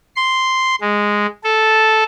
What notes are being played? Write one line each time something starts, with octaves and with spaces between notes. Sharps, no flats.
C6
G#3
A4